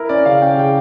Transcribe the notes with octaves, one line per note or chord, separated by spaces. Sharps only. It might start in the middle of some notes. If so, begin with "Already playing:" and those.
Already playing: E4 A#4
C#4 D5
C#3 F5
C#4 G5
C#3 G5